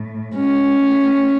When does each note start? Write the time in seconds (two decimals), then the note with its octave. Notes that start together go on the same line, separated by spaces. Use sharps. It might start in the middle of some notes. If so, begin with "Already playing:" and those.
Already playing: A2
0.35 G#3 C#4
0.81 A3